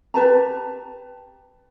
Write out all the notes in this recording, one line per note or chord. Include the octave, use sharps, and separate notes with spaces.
G4 B4 A5 A#5